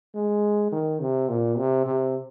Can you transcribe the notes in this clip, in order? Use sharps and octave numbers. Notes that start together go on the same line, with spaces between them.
G#3
D#3
C3
A#2
C3
C3